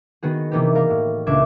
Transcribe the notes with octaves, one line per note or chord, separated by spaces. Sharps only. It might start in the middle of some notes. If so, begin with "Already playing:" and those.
D#3 B3 F#4 G#4
C3 E3 A#3 B3 D#4 G4
B3 A#4 F5
A2
C#2 A#2 D4 E5 D6 G#6